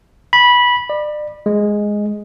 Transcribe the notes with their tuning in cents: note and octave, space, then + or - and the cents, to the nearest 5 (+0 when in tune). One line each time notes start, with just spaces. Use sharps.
B5 -15
D5 +35
G#3 +0